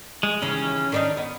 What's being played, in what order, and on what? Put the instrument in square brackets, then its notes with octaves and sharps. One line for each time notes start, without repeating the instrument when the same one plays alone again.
[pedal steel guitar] G#3
[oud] D#2 C#3 E3 [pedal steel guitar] C#4
[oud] D#3 D4 D#4
B3